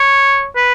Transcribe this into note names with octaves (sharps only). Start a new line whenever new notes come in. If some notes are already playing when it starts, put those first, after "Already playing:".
Already playing: C#5
B4